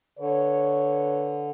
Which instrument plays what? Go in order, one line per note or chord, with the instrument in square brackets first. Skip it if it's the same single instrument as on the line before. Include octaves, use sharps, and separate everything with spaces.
[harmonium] D3 [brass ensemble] B4 C#5